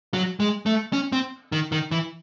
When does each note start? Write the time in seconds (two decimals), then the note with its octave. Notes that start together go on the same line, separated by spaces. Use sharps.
0.14 F#3
0.40 G#3
0.66 A3
0.93 C#4
1.12 C4
1.52 D#3
1.72 D#3
1.91 E3